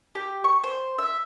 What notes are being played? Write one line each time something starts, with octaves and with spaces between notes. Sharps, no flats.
G4
C#6
C5
E5